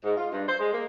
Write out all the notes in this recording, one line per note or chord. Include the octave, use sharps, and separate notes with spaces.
G#2
F4
G2
C5
G#3
A#3